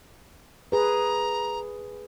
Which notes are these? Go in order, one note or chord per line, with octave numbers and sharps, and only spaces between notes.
G#4 B4 A#5